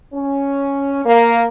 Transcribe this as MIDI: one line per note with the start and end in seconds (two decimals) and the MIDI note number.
0.14 1.05 61
1.06 1.46 58